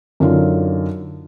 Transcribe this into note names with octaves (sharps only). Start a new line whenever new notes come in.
F#2 D3 D#4 F4